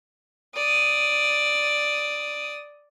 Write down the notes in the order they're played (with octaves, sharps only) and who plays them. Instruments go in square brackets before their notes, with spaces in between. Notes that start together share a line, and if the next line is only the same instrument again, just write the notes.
[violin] D5 D#6